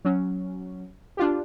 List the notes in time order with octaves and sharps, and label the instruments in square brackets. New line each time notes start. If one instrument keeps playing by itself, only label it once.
[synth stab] F#3 C#4
D4 F4 G4